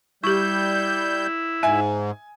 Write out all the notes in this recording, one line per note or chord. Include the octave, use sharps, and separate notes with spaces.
G3 E4 G4 C#6 G6
G#2 E5 G#5